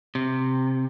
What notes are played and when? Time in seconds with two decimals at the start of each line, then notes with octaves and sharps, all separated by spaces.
0.15 C3